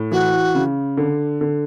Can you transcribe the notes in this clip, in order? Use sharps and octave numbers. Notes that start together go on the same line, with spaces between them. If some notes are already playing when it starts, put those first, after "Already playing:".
Already playing: A2
E3 F#4
C#3
D3
D3